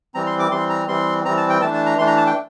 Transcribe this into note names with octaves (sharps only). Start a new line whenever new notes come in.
E3 G3 C4 A#5
C6
D6
E3 G3 C4 C6
A#5
E3 G3 C4 C6
E3 G3 C4 A#5
A5
G5
E3 A3 D4 A5
A5
A#5
E3 A3 D4 C6
A#5
A5
G5